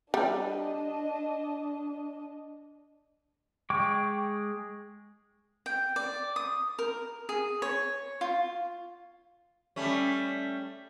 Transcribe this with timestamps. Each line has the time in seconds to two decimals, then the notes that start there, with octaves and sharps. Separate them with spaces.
0.14 G3 D4 D#5
3.70 G#3 G5 C#6 D6
5.66 G5
5.96 D5
6.36 D#6
6.79 A#4
7.29 G#4
7.62 C#5
8.21 F4
9.76 G3 A3 C#4